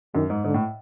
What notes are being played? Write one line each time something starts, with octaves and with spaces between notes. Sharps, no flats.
F#2 D#3
G#2
G#2 D3
A2